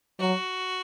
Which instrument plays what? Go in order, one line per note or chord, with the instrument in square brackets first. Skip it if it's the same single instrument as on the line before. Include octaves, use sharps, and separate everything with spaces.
[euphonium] F#3 [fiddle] F#4